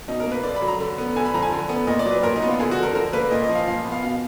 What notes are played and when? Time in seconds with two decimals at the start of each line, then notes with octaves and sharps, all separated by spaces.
0.08 B2 D#4
0.20 A#4
0.26 A#3
0.32 B4
0.43 D3 D5
0.56 B5
0.62 F#3
0.68 A#5
0.80 D3
0.98 B3
1.16 D3 G#5
1.25 B5
1.34 F3 A#5
1.43 G#5
1.52 D3
1.69 B3
1.87 A#2 D#5
1.99 D5
2.05 F#3
2.11 B4
2.23 A#2 A#4
2.36 D#4
2.42 B3
2.48 F4
2.59 D3 G#4
2.71 F#4
2.78 F3
2.83 A#4
2.95 D3 A#4
3.13 A#3 B4
3.31 A#2 D#5
3.44 D#5
3.49 F3
3.55 F5
3.68 A#2 F5
3.84 B3
3.92 F5
4.02 B2 F5